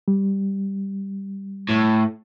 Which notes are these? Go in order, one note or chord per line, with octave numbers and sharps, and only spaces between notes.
G3
A2